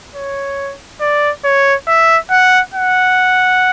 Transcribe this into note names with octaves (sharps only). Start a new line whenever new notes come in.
C#5
D5
C#5
E5
F#5
F#5